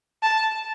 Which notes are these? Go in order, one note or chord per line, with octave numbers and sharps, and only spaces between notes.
A5